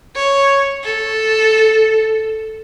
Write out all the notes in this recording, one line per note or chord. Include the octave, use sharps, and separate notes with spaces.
C#5
A4